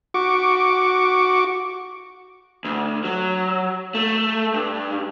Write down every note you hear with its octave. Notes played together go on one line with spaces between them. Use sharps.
F#4 C#6 D6
D2
F#3
A3
G2